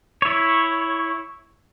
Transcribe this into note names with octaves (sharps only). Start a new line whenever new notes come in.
E4 C#5